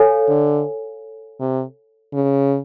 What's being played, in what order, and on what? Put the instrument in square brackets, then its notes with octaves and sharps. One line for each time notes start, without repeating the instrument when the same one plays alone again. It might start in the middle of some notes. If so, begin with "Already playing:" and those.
Already playing: [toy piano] A4 C#5 F5 G#5
[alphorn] D3
C3
C#3